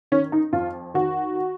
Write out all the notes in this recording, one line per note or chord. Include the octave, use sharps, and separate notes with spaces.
D#3 C#4
D#4
F2 F4
D#3 F#4